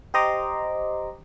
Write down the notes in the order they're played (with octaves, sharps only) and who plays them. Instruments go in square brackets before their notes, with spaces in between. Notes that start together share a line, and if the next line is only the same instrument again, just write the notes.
[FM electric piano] G4 C5 D#5 A#5 C6 D6